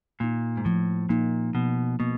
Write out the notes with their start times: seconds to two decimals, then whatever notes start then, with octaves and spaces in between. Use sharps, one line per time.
0.20 A#2 A#3 D#4
0.57 G#2
0.65 A2 F3
1.09 A#2 A#3 D#4
1.54 B2 F3
2.00 B2 A#3